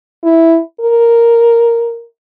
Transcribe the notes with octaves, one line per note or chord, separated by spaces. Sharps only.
E4
A#4